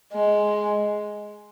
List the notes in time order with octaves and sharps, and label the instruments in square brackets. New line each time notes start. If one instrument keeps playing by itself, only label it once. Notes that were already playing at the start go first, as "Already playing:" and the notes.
[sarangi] G#3